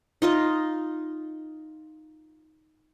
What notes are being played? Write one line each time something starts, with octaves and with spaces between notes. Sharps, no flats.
D#4 F4 D#5